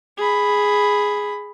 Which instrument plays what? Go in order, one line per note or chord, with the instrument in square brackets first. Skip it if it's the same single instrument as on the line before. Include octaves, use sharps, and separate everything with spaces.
[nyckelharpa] G#4 B5